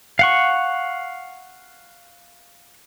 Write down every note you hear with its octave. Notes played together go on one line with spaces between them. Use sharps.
F5 F#5 C#6